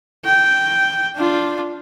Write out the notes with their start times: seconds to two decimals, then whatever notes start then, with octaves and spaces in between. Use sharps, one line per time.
0.25 G5
1.17 D4 F4